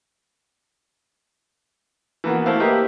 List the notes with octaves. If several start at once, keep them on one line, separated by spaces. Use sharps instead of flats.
E3 A#3 B3 F#4
A3 C4 E4 C5 F5
A#3 G4 B4 C5 D#5 E5